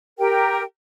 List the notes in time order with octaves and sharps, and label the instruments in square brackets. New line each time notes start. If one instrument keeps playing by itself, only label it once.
[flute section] G4 A#4 G5